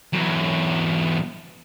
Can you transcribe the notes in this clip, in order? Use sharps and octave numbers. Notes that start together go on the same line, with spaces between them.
E2 F#3